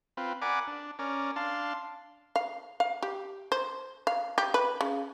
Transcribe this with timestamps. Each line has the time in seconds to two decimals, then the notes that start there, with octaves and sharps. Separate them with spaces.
0.17 C4 F4 B4
0.42 A#4 D5 F#5 G#5 B5 D6
0.67 D4
0.99 C#4 A#4 D5
1.36 D4 F5 A5 C6
2.36 F5
2.80 F5
3.03 G4
3.52 C5
4.07 F5
4.38 G4
4.54 B4
4.81 C#3